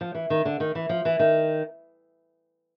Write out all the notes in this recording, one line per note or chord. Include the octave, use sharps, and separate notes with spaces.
F3
E3
D#3
D3
D#3
E3
F3
E3
D#3